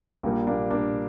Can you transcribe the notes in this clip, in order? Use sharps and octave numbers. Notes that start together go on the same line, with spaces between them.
A#1 A#2 G3 A#3
A#3 D4
A#3 D4